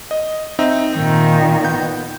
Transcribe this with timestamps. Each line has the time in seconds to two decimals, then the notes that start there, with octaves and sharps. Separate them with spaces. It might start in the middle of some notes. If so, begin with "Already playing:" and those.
0.11 D#5
0.59 C4 D#4 E5
0.95 A#2 D#3
1.64 B3 G6